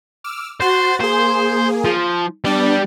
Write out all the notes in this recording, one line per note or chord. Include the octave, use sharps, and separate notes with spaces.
D6 E6 F6
F#4 C5 F#6 A6
A#3 G#4 C5
F3
G3 B3 D4 D5